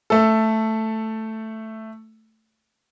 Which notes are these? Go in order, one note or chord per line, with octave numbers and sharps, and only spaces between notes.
A3 A4